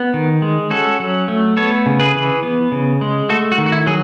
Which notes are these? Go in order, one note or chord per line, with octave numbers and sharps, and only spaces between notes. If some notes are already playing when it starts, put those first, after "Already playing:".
Already playing: B3
D#3
G#3
C#4 F#4 A4
F#3
A3
B3 A4 C#5
C#3
G#4 B4
E3
B3
C#3
G#3
A3 F#4 A4
F#4
D#3
F#4
E4
F#3 G#4